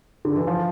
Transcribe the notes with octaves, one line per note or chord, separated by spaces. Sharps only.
D3
E3
F3